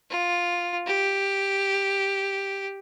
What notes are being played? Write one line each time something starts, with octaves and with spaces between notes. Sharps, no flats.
F4
G4